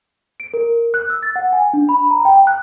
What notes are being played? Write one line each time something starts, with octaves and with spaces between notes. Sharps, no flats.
D7
A#4
F#6
E6
A6
F#5
G#5
D4
B5
A#5
G5
F#6